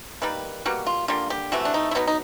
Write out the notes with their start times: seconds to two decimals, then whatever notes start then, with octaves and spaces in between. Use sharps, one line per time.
0.22 D#3 G3 A#3 B4
0.65 B2 G3 A#3 F#4
0.87 F4
1.08 D3 G3 A#3 F4
1.30 G4
1.52 C3 E3 A3 F#4
1.65 D4
1.74 D#4
1.91 E4
1.95 B2 F#3 B3 D#4
2.07 D#4